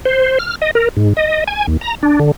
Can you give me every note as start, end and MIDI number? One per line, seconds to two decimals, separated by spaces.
0.05 0.38 72
0.39 0.55 89
0.62 0.71 75
0.75 0.89 70
0.97 1.13 44
1.17 1.44 75
1.48 1.66 80
1.67 1.77 39
1.81 1.95 82
2.03 2.19 62
2.19 2.32 50